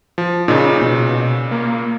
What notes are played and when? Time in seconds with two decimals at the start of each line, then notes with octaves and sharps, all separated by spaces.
0.18 F3
0.48 A#2 C#3 D#4
0.82 B2
1.51 A#3